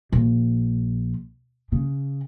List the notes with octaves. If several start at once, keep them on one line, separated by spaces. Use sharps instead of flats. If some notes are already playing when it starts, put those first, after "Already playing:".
A#1
C#3